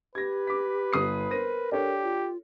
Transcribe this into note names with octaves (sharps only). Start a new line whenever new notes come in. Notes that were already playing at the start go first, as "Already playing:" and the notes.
G4 B4 G#6 A#6
D6 B6
G1 D#6 C7
A#4 C5 A#6 D#7
D4 G4 A4 C#5
F4